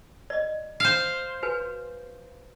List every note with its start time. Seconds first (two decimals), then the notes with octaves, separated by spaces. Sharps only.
0.30 D5 D#5
0.80 C5 F5
1.43 F#4 B4 G#5